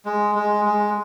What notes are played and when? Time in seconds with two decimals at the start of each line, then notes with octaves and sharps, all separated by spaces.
0.05 G#3
0.35 G#3
0.65 G#3